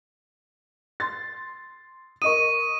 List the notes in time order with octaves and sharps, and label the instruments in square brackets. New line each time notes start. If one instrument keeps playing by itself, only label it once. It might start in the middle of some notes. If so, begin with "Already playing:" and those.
[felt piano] C6 A6
[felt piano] A#4 D#5 D#6 [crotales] C#6 D#7